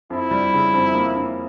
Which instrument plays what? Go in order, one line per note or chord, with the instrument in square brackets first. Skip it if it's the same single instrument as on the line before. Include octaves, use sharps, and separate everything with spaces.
[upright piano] F2 [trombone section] E4
[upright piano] G3
C#3
F2
A#3
A#3